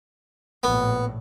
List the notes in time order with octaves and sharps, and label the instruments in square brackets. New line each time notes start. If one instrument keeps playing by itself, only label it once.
[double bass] A#1 A2 [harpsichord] B3